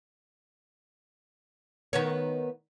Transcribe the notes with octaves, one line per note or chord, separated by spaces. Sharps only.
D#3 B3 C#5